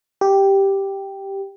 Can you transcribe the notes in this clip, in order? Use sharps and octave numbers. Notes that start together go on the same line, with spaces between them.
G4